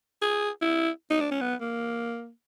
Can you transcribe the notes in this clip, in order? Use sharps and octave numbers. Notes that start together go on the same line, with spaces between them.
G#4
E4
D#4
D4
C#4
B3
A#3